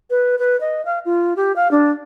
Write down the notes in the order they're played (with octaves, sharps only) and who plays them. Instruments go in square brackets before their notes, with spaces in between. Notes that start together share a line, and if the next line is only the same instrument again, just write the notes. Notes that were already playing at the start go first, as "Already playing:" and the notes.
[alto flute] B4
B4
D#5
F5
F4
G4
F5
D4